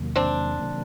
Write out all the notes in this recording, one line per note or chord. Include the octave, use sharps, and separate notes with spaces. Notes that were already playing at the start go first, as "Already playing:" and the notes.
Already playing: E2 C3 D#3 F#3 A#3
C4 D4
C3 D#3 F#3 A#3